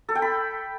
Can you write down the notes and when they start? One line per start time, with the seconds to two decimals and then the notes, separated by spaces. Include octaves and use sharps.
0.09 A4
0.15 G5
0.22 B5